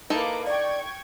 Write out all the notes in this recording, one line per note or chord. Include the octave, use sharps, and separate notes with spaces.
A#3 D#4 E4 A4 B4 D6
D5 G5 C#6 G#6